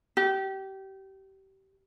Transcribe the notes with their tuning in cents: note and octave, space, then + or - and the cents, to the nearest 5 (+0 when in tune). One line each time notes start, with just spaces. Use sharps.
G4 -25